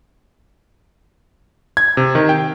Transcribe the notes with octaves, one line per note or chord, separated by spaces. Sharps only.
G#6
C3
D#3
G5